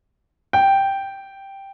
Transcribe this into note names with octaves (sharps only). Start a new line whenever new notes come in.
G5